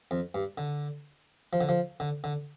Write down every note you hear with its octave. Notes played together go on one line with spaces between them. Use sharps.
F2
G2
D3
F3
D3
F3
D3
D3